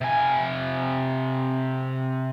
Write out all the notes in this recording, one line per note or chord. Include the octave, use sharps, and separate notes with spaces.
C3 G#5